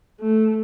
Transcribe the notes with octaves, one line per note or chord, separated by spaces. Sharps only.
A3